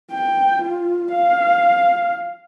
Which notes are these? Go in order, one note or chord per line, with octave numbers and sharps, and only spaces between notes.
G5
F4
F5